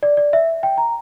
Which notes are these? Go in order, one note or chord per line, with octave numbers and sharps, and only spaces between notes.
D5
D5
E5
G5
A#5